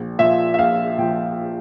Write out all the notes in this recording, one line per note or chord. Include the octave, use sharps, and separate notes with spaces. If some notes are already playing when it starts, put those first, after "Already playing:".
Already playing: A#1
A#2 F3 E5
E5
A#1 F5
A#2 F3 G5